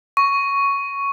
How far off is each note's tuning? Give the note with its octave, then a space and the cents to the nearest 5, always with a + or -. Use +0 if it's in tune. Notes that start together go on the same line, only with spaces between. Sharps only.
C#6 +5